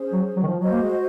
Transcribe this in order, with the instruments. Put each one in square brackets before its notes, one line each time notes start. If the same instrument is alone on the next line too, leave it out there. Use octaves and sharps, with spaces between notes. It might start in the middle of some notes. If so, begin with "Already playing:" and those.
Already playing: [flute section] C#4 G#4 C5
[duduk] F#3
F#3
D#3
F3
[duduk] F#3 [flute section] F#4 C5 D#5
[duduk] A#3
G#3